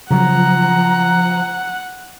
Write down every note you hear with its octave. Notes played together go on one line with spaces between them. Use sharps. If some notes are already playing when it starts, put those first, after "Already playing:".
C#3 F3 F#3 F#5 A#5